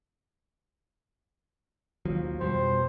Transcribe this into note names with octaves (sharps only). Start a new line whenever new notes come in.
D#2 F3 F#3
F2 B2 G3 C5